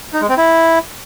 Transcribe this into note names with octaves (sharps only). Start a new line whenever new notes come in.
D#4
G#3
C4
E4